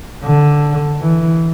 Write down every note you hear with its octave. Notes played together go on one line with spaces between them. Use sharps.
D3
E3